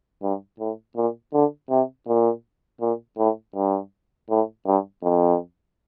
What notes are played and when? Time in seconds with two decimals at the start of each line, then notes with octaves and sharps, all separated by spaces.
0.22 G2
0.59 A2
0.96 A#2
1.33 D3
1.70 C3
2.07 A#2
2.81 A#2
3.18 A2
3.55 G2
4.30 A2
4.66 G2
5.03 F2